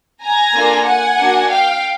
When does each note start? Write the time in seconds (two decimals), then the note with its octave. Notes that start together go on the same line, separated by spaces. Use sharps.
0.23 G#5 A#5
0.55 A#3 D4 F4 A4
0.86 F#5 G#5
1.19 A#3 D4 F#4
1.50 F5 G5